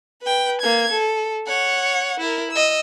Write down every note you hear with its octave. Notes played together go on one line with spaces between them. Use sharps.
B4 G5
A#3 G#6
A4
C#5 F#5
E4 A#4
D#5 E6